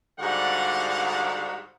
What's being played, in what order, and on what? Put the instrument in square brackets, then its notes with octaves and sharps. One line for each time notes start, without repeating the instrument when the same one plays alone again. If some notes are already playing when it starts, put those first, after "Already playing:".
[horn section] G#2 D3 G3 F#4 F5 F#5